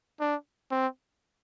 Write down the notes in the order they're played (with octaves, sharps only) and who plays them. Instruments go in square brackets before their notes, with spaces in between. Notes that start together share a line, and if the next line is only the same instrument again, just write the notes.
[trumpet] D4
C4